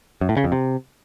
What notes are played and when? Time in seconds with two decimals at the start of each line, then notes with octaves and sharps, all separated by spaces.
0.21 F#2
0.29 A2
0.37 C#3
0.44 F2
0.52 C3